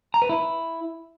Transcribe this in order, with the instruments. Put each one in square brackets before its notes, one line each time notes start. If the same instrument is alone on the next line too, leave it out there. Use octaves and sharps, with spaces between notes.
[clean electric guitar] A#5
B4
E4